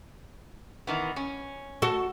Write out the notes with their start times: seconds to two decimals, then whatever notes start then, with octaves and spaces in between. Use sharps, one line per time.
0.87 D#3 E3 B3
1.16 C#4
1.82 F#4 A4